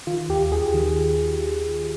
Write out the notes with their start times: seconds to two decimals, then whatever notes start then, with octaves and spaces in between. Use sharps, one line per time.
0.07 D#3 F4
0.29 D#2 G4
0.51 D#2 G#4
0.74 D#3